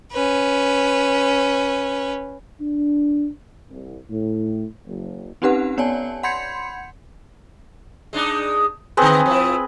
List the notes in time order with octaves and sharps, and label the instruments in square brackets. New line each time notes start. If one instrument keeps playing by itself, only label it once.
[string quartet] C#4 B4
[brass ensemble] D4
C2
A2
F#1
[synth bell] C4 C#4 D#4 G4 B4 F#5
B3 C#5 D5 G#5 A5
F#5 B5 C6 G6 G#6 C#7
[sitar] G#3 D4 D#4
[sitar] D3 B3 [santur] C4 G#4 B4
[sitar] F3 E4